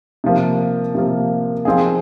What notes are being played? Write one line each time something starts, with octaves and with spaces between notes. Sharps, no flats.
C3 F3 A#3
C3 F3 A#3
F3 C4 D#4 G#4